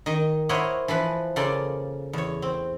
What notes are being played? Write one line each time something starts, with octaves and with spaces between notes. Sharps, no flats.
D#3 D#5
E4 A#4 C5 C#5 D#5 F#5
E3 F3 B4
C#3 A#3 A4 D5 C6
E2 C#5
C4